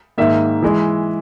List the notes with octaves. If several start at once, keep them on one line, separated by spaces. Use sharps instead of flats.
G#2 D#3 A#3 E5
E3 G#3